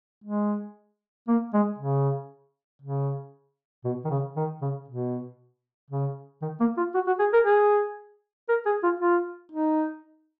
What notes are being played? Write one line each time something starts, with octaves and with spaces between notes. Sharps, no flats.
G#3
A#3
G#3
C#3
C#3
B2
D#3
C#3
D#3
C#3
B2
C#3
D#3
A#3
F4
F#4
F#4
G#4
A#4
G#4
A#4
G#4
F4
F4
D#4